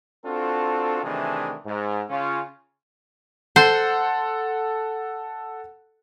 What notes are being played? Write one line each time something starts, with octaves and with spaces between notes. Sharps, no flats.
C4 D4 F4 F#4 A4
C3 D#3 E3 A3 D4 G#4
G#2
C#3 C#4 F4
A4 C5 F#5